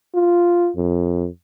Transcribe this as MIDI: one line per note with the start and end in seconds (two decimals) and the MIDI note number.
0.15 0.70 65
0.76 1.27 41